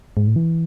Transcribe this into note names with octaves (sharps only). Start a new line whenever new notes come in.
G#2
A2
E3